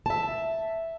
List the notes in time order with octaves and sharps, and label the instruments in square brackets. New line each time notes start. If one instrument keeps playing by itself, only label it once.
[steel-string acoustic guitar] E5 A5